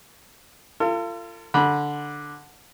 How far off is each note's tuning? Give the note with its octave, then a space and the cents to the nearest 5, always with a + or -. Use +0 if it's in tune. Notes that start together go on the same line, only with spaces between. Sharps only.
F4 -30 A4 +40
D3 +0 B5 -20